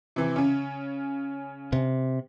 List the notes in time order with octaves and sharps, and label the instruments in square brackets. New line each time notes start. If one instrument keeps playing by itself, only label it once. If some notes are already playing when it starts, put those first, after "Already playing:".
[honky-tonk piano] C3 E3
C#3 C#4
[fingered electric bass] C3